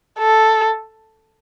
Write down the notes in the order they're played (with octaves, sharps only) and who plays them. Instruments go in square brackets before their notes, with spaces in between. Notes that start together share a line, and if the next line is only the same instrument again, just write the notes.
[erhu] A4